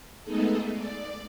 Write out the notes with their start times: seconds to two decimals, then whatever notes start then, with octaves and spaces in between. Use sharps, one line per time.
0.23 G#3 A3 B3 D#4 G#4 A4
0.73 D5